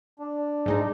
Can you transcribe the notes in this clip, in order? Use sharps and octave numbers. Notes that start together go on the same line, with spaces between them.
D4
G#2 G#3 D#4